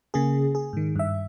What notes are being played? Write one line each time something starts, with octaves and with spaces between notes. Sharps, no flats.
C#3 A#3 G#4
G#4
G#2 D#3
G2 E5